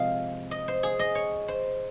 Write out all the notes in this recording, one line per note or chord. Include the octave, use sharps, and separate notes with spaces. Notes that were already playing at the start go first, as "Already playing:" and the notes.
Already playing: C3 F3 G#3 D#5 F5
D#5
C5
G#4
D#5
C#5
C5